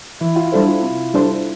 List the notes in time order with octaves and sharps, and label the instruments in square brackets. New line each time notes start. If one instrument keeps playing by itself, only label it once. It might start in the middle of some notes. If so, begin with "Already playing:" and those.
[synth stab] E3 [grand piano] E4
[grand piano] F4
[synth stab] G3 D4 A4 C5 [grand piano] E4
[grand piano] F4
[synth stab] C3
G3 D4 A4 C5